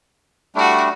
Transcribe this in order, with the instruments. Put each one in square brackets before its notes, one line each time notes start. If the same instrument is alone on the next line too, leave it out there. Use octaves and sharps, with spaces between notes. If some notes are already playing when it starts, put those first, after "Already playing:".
[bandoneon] G3 A3 D4 [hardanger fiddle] E4 F#4